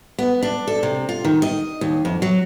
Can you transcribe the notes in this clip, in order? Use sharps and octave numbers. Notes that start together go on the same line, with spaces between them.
B3
D4
A4
C3
F4
D#3
D#5
D#2
F2
F#3